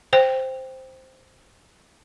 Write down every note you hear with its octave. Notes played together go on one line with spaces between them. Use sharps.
C5 G5